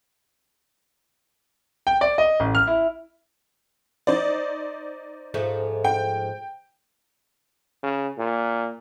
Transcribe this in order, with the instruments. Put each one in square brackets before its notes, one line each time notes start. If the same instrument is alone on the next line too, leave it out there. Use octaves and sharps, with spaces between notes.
[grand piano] G5
D5
D#5
A1
F6
E4
[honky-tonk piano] D#4 C5 D5
[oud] G#2 F3 A3
[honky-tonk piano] G5
[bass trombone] C#3
A#2